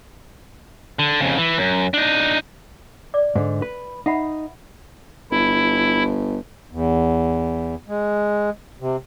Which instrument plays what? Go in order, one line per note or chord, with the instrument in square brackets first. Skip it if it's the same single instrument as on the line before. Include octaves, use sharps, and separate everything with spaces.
[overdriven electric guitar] D3
F2 C#3
E3
F#2
D4 D#4
[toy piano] D5 D6
[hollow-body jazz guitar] G#2 D3
B4
[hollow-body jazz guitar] D#4 [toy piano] E5 F#5 B5
[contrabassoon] G1 [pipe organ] E4
[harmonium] E2
G#3
C3